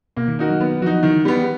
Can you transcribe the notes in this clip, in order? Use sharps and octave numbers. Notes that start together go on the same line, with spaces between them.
B2 A#3
D#3
D#4 F#4 A#4
F#3
F#3 B3
F3 D#4 F#4
D#3 E3
G3 B3